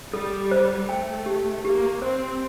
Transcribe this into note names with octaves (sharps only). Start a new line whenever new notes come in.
G3 A4
C5
A3 G5
G4
A#3 G4
C4 C5